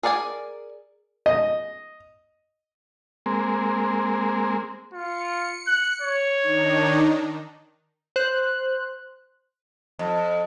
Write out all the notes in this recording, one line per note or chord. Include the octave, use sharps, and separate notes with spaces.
G#4 A#4 D5 F#5 G#5
D#5
G#3 A#3 C4
F4 C#7
F#6
C#5
D#3 D4 D#4
C5 F#6
F2